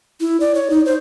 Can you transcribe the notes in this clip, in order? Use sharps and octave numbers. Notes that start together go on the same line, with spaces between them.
E4
D5
C#5
D#4
C5